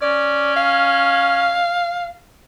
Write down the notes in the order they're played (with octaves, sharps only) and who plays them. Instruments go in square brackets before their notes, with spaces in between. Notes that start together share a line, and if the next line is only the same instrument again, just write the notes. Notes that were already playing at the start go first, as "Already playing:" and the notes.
[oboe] C#4 [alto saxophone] D5
[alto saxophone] F5